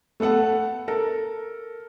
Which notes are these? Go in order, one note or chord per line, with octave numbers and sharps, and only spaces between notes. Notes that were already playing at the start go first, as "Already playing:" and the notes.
A3 B3 A4 F#5 A5
A4 A#4